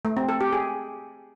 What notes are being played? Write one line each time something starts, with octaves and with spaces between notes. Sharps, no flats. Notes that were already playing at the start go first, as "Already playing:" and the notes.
A3
C4
A4
G4
G#4